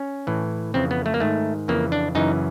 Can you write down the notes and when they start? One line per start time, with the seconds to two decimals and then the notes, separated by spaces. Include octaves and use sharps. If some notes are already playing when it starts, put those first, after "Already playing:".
Already playing: C#4
0.27 A2 E3
0.74 F2 C#3 E3 C4
0.91 B3
1.06 A3
1.14 A#3
1.20 G#2 D#3 A3
1.68 F2 C#3 E3 A#3
1.92 D4
2.15 F#2 C#3 E3 D#4